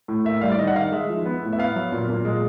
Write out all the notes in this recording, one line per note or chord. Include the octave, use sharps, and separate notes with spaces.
A2
A#3 E5
G3 F5
D5
D#3 D#5
F#5
D#3 F5
G#3 E5
F3
B3
A2
E5
B3 F5
F#3
A#2
A#2
G#3